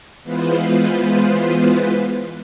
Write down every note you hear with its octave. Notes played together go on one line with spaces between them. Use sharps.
E3 G#3 B3 F4 B4 C5